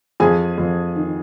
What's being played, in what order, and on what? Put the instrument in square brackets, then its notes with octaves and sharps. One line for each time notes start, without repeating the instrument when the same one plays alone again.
[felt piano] F2 G#4 G#5
F2
D#3